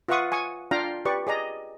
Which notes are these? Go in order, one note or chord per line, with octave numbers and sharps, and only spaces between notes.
F4 B4 E5 F#5 C#6 D#6
G#5 C#6 D#6
D4 F4 F5 G5 A#5
G4 B4 D5 C#6
G#4 D5 D#5 A#5